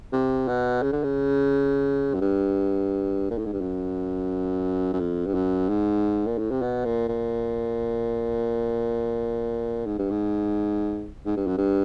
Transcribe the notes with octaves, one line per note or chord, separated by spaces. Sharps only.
C3
B2
C#3
D3
C#3
F#2
G2
A#2
A2
G#2
G2
F#2
F#2
F2
G2
F#2
G#2
A#2
A2
C3
B2
A#2
A#2
G#2
G2
G#2
G#2
G2
F#2
G2